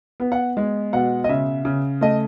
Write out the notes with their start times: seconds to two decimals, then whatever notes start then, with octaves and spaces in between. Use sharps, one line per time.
0.20 B3
0.32 F#5
0.57 G#3
0.93 B2 F#5
1.24 D#5
1.29 C#3 E5
1.65 C#3
2.01 A3 D#5